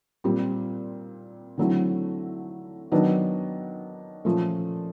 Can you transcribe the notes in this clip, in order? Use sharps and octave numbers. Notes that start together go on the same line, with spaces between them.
A#2 G3 C4
D3 F#3 A3 C4 E4
D#3 F#3 B3 D4
A#2 F3 A3 C#4